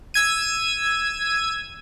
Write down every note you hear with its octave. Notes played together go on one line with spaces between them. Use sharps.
E6 G#6 D#7